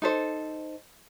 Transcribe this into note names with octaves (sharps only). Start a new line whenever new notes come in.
D#4 A4 C5